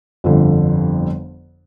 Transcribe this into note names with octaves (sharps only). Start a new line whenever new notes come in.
G1 F2 D3 F3